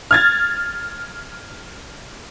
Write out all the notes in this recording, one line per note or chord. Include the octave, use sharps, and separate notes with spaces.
F6 G#6 A6